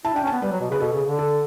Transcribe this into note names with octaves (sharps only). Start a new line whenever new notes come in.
E4 A5
D4 G5
C#4
A5
B3
G3 B4
F#3
B2
C#3 B4
B2 A4
C#3
D3
A4